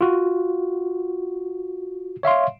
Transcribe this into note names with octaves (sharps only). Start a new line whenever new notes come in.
F4 F#4
C#5 E5 F5 C6